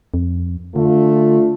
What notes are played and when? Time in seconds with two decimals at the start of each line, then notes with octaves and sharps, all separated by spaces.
0.14 F2
0.76 D3 A3 D4 F4